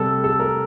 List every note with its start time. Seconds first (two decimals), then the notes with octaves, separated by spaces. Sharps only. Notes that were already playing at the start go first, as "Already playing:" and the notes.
Already playing: C3 G3 A4
0.24 A4
0.40 A#4